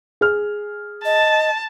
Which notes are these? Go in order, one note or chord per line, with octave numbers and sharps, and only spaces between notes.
G#4 F6
D#5 A5